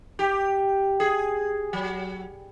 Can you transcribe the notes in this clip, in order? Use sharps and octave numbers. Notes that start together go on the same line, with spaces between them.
G4
G#4
F#3